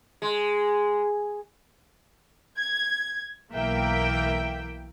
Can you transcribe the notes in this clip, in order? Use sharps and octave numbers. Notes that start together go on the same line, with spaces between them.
G#3
G#6
B1 E3 A#3 E5 G5